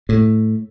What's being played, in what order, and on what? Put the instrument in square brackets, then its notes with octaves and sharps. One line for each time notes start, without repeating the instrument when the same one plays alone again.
[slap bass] A2